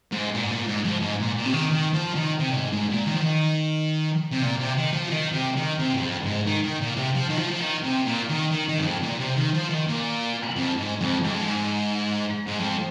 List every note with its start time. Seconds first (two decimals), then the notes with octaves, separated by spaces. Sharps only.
0.12 G#2
0.35 A#2
0.44 G#2
0.51 A#2
0.68 G#2
0.85 F2
1.02 G#2
1.20 A#2
1.37 A#2
1.46 C3
1.54 D#3
1.71 D#3
1.94 F3
2.15 D#3
2.39 C3
2.50 A#2
2.56 G#2
2.73 G#2
2.90 A#2
3.06 D#3
3.14 F3
3.21 D#3
4.31 C3
4.42 A#2
4.60 C3
4.77 D#3
4.93 F3
5.11 D#3
5.33 C3
5.57 D#3
5.79 C3
5.94 G#2
6.01 F2
6.24 G#2
6.46 D#3
6.64 D#3
6.82 A#2
6.97 C3
7.15 F3
7.29 D#3
7.37 F3
7.50 F3
7.60 D#3
7.84 C3
8.05 A#2
8.29 D#3
8.51 D#3
8.68 D#3
8.78 G#2
8.85 F2
9.03 A#2
9.20 C3
9.37 D#3
9.54 F3
9.70 D#3
9.87 A#2
10.56 F2
10.78 G#2
11.01 F2
11.24 G#2
11.31 F2
11.40 G#2
12.47 G#2
12.60 F2